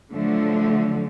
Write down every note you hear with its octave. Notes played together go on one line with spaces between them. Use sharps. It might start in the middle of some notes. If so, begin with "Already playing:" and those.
D3 F3 F#3 A3